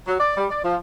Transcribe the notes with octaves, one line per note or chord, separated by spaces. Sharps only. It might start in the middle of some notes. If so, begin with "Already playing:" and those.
F#3
D5
G3
D5
F3